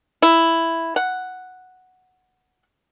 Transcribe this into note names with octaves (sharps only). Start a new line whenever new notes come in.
E4
F#5